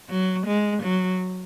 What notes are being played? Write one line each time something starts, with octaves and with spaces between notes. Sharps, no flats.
F#3
G#3
F#3